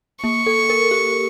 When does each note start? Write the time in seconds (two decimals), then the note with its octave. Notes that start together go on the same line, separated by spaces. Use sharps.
0.24 A#3 C#6
0.46 A4
0.70 A#4
0.91 G4